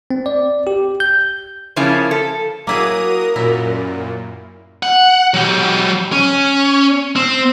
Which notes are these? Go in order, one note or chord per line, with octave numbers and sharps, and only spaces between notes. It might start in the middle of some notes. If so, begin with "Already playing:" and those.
C4
D5
G4
G6
C#3 F3 A#3 C#4 E4
A4
F#3 A#3 E4 G#4 A#4 D#6 D#7
F#2 A#2 E4
F#5
F#3 G4
C#4
C4